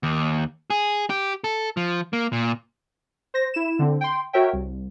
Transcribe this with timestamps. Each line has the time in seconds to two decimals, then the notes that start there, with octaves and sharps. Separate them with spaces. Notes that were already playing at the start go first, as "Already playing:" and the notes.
0.03 D#2
0.70 G#4
1.10 G4
1.44 A4
1.77 F3
2.13 A#3
2.33 A#2
3.34 C5 A#6
3.54 E4 E7
3.79 D3 C4
4.01 G5 C6
4.33 F#4 A#4 C#5 E5 G5
4.53 C2